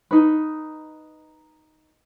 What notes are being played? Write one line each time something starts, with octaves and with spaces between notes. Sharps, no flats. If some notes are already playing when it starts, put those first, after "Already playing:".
D#4 B4